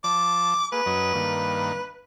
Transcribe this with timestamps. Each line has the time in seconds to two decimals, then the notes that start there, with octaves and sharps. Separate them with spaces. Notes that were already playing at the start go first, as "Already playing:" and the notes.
0.04 F3 A5 D6
0.72 A#3 G#4 B4
0.86 F#2 F#3 D#5
1.15 G2 D#3 A#3